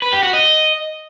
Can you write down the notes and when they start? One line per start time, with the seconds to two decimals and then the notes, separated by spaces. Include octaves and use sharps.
0.02 B4
0.13 G4
0.23 F#4
0.33 D#5